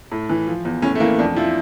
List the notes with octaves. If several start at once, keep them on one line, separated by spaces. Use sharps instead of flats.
A2
E3
F3
E2
A2 C#4
A3
E3 A#3
F2 D4
F3 E4